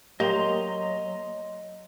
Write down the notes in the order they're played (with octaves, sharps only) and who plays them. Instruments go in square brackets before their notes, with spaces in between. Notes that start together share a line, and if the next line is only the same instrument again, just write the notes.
[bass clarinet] F#3 [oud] A#3 [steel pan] G4 [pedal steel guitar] D#5 A#5 C6